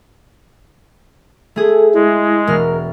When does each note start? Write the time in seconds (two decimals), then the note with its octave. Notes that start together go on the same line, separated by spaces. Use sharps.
1.56 A3 G#4 A4
1.94 G#3 E4
2.47 E1 A#4 F6